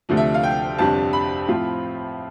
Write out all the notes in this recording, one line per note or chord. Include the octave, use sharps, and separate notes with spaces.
D2 C3 F3 A3 D4
E5
F5
G5
G1 F2 C3 G3 D4 A5
B5
A2 F3 C4 F4